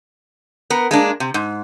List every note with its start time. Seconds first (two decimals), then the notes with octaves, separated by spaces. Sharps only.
0.70 B3 A#4
0.91 G#3 A#3 D4
1.20 C3
1.34 G#2